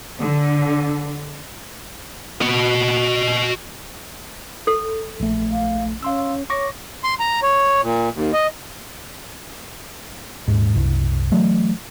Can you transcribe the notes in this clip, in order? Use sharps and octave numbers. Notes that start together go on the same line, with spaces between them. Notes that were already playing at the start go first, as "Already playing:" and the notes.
D3
F#4 D#5
A4
A#1 A3
F5
C#4 F5 C6 E6
C#5 C#6 D6 A#6
C6
A#5
C#5
A#2
D#2
D#5
D#1 G#2
F#1 C2
E3 F#3 A3